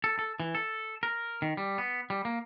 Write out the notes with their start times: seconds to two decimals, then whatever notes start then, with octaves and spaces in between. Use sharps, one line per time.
0.04 A4
0.19 A4
0.40 E3
0.55 A4
1.03 A#4
1.42 D#3
1.57 G3
1.78 B3
2.10 G3
2.25 A#3